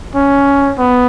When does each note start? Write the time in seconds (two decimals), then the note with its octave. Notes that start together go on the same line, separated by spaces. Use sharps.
0.15 C#4
0.78 B3